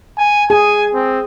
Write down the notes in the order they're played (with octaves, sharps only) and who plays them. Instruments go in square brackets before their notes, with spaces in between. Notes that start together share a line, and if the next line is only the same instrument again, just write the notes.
[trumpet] G#5
[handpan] G#4 [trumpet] G#5
[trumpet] C4